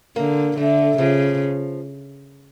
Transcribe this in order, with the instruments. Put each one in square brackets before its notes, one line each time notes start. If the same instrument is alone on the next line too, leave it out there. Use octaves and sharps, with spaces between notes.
[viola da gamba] D3 [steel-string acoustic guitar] A#3
[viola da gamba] D3 [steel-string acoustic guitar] A3
[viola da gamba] C#3 [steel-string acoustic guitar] F3